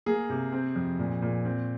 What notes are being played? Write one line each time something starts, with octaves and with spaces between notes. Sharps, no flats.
A#3 G#4
C3
C4
F2
A#2
A#2
C4